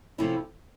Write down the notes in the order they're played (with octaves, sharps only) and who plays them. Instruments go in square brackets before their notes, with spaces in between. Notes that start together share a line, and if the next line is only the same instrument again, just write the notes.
[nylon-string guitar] C3 F3 A3 C#4 E4